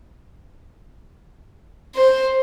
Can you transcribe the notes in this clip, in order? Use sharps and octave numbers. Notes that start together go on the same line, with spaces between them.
C5